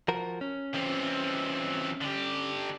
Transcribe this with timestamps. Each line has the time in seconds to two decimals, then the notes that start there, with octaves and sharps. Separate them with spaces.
0.08 F3 F#4 A#4
0.41 C#4
0.74 E3 C4
2.01 D3 G4